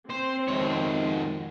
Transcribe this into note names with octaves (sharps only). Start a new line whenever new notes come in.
C4 C5
F2 G#2 B2 D#3 C#5